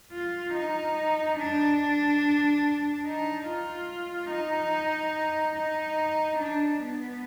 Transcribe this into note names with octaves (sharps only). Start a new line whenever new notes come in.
F4
D#4
D4
D#4
F4
D#4
D#4
D4
B3